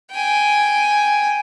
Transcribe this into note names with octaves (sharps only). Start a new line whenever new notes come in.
G5 G#5